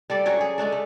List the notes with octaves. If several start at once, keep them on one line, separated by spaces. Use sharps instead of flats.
G3 A4 D5
F#3 C#4 D4 C#5
G#4
G#3 A3 D4 A4
A3